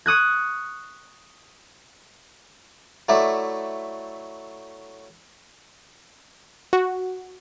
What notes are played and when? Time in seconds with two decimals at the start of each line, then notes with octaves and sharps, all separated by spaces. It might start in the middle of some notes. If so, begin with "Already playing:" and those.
0.06 C#6 D#6 F#6 G#6
3.09 F#3 A3 E4 D5 E5
6.73 F#4